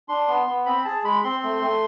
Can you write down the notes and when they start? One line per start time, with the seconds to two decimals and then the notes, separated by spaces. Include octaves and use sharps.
0.09 D4 C6
0.28 B3
0.46 B3
0.66 C4 B5
0.85 G#4 A5
1.04 G#3 B5
1.24 C4 C6
1.43 A3
1.62 A3